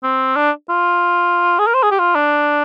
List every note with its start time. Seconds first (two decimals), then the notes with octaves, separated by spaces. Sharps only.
0.03 C4
0.36 D4
0.69 F4
1.59 G#4
1.67 A#4
1.74 C5
1.83 G#4
1.91 G4
1.99 F4
2.15 D4